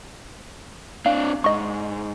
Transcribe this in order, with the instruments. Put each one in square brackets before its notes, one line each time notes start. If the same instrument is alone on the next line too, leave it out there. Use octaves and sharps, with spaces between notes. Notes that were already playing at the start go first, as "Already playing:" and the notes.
[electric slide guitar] C4 D4 [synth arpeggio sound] F5
[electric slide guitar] G#2 [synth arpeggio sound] D#5 C#6